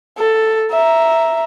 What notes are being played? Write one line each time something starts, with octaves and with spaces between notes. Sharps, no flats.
A4
E5 A#5